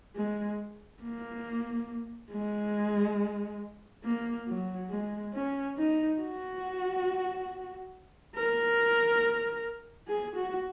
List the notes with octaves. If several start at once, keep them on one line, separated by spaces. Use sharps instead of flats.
G#3
A#3
G#3
A#3
F#3
G#3
C#4
D#4
F#4
A#4
G#4
F#4